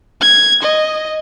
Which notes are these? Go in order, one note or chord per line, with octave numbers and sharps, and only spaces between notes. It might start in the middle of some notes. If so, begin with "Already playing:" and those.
G#6
D#5